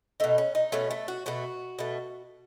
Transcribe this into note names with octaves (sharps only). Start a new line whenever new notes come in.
B2 A3 D#4
C#4
D#4
B2 A3 C#4
A3
F#4
B2 A3 F#4
B2 A3